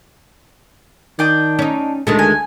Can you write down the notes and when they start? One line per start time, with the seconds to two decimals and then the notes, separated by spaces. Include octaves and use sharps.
1.19 D#3 D4 G5 D#6
1.59 C#4 D#4
2.07 D2 D#3 G#3 A3 A5
2.19 G#5